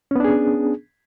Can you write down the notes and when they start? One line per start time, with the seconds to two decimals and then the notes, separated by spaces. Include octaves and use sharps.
0.11 C#4
0.16 B3
0.20 D4
0.24 G#4